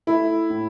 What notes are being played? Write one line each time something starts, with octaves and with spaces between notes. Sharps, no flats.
A3 E4
A2